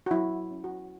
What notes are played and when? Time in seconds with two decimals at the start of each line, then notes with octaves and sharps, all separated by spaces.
0.06 F#4
0.11 F#3 E4
0.51 C#4
0.64 F#4